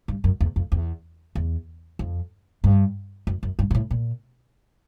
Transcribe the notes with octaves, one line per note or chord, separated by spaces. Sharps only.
G2
F#2
E2
F2
E2
E2
F2
G2
F#2
F#2
G2
G#2
A2
A#2